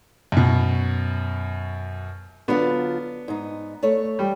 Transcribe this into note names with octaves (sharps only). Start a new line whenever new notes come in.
F#2 B2
D3 F#3 B3 D4 F4
G#2 D#4
A3 C#5
G3